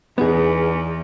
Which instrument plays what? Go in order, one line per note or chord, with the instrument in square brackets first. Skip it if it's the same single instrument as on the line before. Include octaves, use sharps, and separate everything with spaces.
[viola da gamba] E2 [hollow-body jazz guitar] B3 D#4 G#4